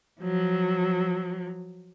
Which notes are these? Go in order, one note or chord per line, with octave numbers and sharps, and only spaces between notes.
F3 F#3